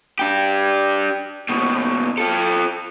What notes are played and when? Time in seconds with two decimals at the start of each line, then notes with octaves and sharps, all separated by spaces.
0.19 D4 G4
1.50 D#2 B2
2.18 F4 A4